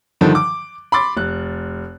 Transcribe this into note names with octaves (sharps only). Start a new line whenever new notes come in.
G2 D3 D#3 F3
D6
B5 C6 D6 A6
F1 F#6